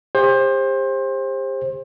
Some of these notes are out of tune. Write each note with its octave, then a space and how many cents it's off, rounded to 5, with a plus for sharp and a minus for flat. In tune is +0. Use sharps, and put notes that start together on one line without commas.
G4 +40 C5 +25